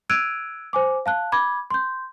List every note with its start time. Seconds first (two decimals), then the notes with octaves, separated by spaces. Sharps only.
0.10 E6 F#6 G#6 D7 D#7 F7
0.73 C5 G#5 D6
1.06 F5 A5 F#6
1.32 B5 D6 G#6
1.70 C6 G6